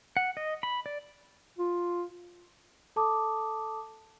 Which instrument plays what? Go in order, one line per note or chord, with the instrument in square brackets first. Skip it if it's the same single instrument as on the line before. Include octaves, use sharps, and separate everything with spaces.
[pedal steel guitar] F#5
D#5
B5
D5
[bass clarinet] F4
[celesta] A4 A5 D6 D#6